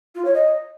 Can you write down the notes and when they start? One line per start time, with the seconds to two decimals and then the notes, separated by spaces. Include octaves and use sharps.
0.15 F4
0.25 C#5
0.34 D#5